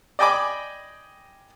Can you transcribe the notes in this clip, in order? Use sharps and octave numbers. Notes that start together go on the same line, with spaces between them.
D5 D#5 G5 G#5 B5 D6